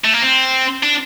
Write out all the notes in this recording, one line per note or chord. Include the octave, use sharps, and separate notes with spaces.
A3
A#3
C4
D4